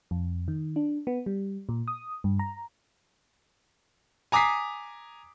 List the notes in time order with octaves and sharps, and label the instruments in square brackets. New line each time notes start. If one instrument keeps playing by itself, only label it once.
[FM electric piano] F2
D#3
D4
B3
G3
A#2
D#6
G2
A#5
[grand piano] G#5 A#5 D6 D#6 B6 C7